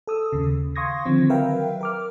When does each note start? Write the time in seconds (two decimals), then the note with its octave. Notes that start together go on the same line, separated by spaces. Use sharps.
0.07 A4 D#6 E6
0.33 D#2 C#3
0.76 F5 C6 C#6 D#6 G#6 A#6
1.05 D3 D#3 F3 C4
1.29 F#3 A#4 B4 E5 F5 G5
1.81 A#4 D6 F6